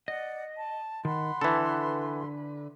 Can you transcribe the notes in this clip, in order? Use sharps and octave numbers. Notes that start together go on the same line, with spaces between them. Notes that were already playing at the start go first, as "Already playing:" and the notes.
D5 D#5 F#5
A5
D#3 F#5 B5 C6
D3 E3 A4 B4